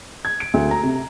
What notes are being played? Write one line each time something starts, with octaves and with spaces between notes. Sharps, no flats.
G#6
D7
D2
A#5
C3
A#5